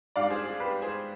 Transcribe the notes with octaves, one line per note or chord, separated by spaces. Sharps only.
G#2 G3 D4 D5 F5
G#4 C5
G#4
G4 B4
G#4 C5